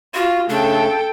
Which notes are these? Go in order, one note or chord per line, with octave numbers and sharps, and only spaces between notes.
F4 F#4
C#3 A3 D4 A4 G5